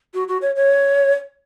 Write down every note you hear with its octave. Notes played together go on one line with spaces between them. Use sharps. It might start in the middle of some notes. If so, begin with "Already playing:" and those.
F#4
F#4
C#5
C#5